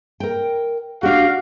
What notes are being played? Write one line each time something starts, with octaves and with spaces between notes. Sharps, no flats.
A#4 G5
D4 F#4 G4 F5